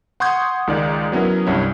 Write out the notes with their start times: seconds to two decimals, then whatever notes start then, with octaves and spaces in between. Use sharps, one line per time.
0.20 F#5 C6 C#6 D#6 G6 G#6
0.67 C#2 D#3 G#3 D5
1.12 F#3 B3 C#4 E4 A#4
1.47 C2 G2 C#4 E4